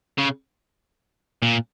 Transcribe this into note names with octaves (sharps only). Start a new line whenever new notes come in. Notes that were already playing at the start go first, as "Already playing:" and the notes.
C#3
A#2